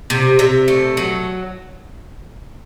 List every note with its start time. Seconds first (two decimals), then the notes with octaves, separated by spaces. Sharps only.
0.10 C3
0.39 C3 E5
0.68 A3
0.97 F#3